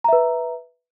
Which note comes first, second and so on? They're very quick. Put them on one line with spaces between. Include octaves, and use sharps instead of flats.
A#5 E5 B4